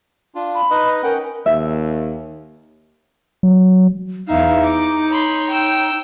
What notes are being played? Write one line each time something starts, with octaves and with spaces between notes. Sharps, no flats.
D4 F4
B5
D#4 B4 D#5
C#4 A#4 F#5 G5
D#2 E5
F#3
E2 D#4 E5 F5
D6
C#5 B5 C6
G5 E6